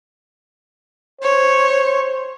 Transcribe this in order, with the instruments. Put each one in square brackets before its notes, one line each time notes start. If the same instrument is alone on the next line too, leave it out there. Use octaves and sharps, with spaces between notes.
[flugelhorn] C5 [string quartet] C#5